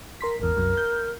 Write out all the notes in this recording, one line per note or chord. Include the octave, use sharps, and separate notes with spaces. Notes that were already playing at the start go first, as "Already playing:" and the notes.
A#4 C6 B6
G#1 E2 A#4
C2 F#2
G6